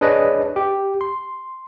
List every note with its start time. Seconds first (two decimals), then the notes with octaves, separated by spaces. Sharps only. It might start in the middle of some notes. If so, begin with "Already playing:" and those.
0.01 D4 G#4 B4 C#5 D#5
0.56 G4
1.01 C6